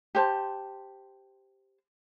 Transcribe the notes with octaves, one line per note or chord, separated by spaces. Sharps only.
G4 C5 A5